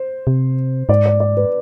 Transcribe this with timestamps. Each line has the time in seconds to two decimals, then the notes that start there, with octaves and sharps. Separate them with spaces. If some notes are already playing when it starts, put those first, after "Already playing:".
Already playing: C5
0.27 C3
0.89 G#2 D5
1.06 D5
1.20 D5
1.37 B4